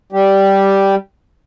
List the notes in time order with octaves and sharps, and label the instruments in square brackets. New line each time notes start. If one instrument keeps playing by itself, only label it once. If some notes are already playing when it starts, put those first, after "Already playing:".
[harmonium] G3 G4